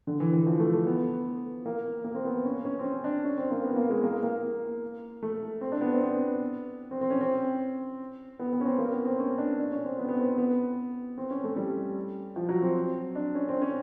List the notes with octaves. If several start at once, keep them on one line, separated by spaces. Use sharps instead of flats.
D3
E3
E3
F3
A3
A3
B3
A#3
A#3
C4
B3
C#4
C#4
C4
C#4
D4
C#4
C4
A#3
B3
A#3
G#3
A#3
A#3
A3
C4
D4
B3
C4
B3
C4
C4
C#4
C4
B3
B3
C#4
C4
A#3
B3
C4
C#4
D4
D4
C#4
C4
B3
B3
C4
B3
C4
C#4
A3
G3
F3
F#3
C4
D4
C#4
C4
C#4